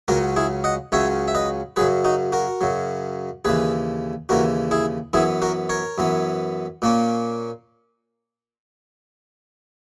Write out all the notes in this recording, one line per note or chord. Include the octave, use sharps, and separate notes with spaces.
C#2 C#3 F#3 C#4 F#4 A#4
E4 G#4
D#5 F#5
C#2 C#3 F#3 C#4 C#5 E5
E5
B4 D#5
F#2 C#3 F#3 G#4 B4
D#4 F#4
F#4 A#4
F#2 C#3 F#3
D#2 C#3 E3 G#4 B4
D#2 C#3 E3 F#4 A#4
E4 G#4
F#2 E3 B3 E4 G#4
F#4 A#4
A#4 C#5
F#2 E3 B3
A#2 A#3 C#4